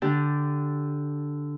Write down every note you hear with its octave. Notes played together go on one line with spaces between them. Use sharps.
D3 D4 G4